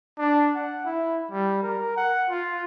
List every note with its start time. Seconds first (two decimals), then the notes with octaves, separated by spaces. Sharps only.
0.18 D4
0.55 F#5
0.85 E4
1.31 G3
1.62 A#4
1.96 F#5
2.30 F4